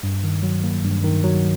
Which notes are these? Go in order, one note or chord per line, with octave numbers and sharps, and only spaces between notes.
G2
D#3
F#3
A#3
G2
D#3
F#3